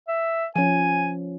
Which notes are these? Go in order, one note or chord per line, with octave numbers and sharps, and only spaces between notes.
E5
F3 C#4 G#5